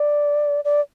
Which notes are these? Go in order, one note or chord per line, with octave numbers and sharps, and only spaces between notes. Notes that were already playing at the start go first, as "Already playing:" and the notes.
Already playing: D5
D5